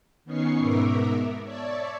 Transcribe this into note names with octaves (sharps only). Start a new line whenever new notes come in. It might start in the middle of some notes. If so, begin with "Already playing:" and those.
D#3 B3 C#4 D#4 C#6 C7
G#2 B2 B3 A#4 E5 D6
C#5 D5 E5 A5